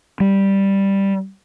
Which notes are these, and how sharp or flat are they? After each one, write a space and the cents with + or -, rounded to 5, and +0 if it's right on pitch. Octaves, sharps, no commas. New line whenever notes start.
G3 +0